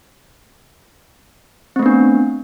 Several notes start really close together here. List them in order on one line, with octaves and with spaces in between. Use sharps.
C4 A3 B3 D4